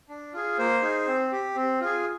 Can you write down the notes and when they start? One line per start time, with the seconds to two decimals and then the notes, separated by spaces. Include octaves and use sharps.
0.09 D4
0.33 F4 G#4
0.58 A#3 C5
0.82 D#4 G#4
1.07 C4
1.32 G4
1.55 C4
1.80 F4 G#4